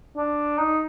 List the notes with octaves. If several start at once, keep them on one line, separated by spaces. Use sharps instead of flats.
D4
D#4